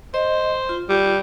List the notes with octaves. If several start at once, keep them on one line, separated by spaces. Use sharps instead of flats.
C5 D#5
F4
G3